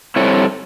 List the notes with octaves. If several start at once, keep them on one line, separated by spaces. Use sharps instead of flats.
G3 C4 E4 A4 C#5